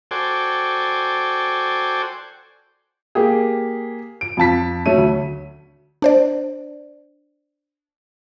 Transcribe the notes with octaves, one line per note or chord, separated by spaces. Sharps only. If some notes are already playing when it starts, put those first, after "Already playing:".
F#4 A4 C5 D5 G5 G#5
A#3 G4 G#4
D7
F2 F4 A5 B6
F#3 A3 C#4 D#7
D2
D4 C5 D5